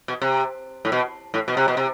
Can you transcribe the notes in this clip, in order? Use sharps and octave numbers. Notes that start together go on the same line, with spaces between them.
B2
C3
A2
B2
A2
B2
C3
B2
C3